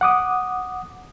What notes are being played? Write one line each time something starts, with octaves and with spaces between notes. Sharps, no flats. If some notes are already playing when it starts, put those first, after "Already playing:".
F#5 D6 D#6